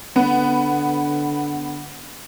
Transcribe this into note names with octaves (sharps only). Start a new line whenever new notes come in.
D3 B3